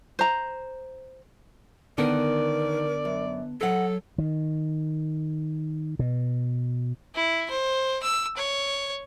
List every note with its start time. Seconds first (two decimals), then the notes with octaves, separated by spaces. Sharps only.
0.19 C5 A#5
1.98 D3 D#3 B3 A#4 D5
3.05 F#2
3.61 F#3 A4 D#5 F#5
4.18 D#3
5.99 B2
7.15 E4
7.50 C5
8.03 E6
8.37 C#5